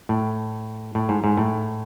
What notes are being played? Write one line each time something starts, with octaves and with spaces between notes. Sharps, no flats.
A2
A2
G#2
G#2
A2